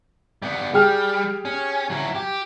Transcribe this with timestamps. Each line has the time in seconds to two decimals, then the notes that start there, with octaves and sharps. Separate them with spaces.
0.42 G3 B3
0.74 G3 G4 G#4 F6
1.45 C#4
1.90 F#3 E4
2.15 G4